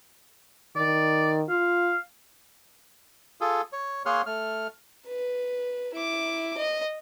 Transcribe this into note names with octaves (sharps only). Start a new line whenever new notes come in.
D#3 D5
F4 F5
F4 G#4 A4
C#5
A#3 G#4 C#5 F#5 C6 F6
A3 F6
B4
E4 D6
D#5